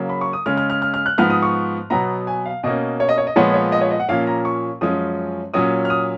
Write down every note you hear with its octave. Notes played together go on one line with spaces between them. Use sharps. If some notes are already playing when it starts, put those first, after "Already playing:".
Already playing: C#3 F#3 A#3
B5
C#6
D#6
C#3 G#3 C#4 F6
F6
F6
F6
F6
F#6
G#2 F3 B3 F6
D#6
C#6
B2 F#3 B3 A#5
G#5
F5
B2 A#3 C#4 D#5
C#5
D#5
C#5
D#5
A#2 F3 G#3 B3 C#5
C#5
D#5
C#5
D#5
F#5
A#2 F3 A#3 C#4 F5
A#5
C#6
F#2 F3 G#3 C#4 D#6
A#2 F#3 C#4 D#6
F6
D#6